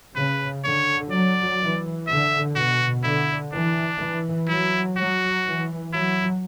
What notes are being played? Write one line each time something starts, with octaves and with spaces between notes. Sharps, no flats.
C#3 B4
D3 C#5
F#3 D5
E3
D3 E5
B2 F#4
D3 E4
E3 D4
E3
F#3 E4
F#3 F#4
E3
F#3 E4